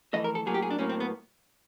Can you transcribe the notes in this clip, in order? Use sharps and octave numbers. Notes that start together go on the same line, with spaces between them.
F2 C3 E3 A3 D#5
A#4
A4
A2 F#3 A#3 G#4
G4
G#4
D4
A2 F#3 A#3 C#4
C4
B3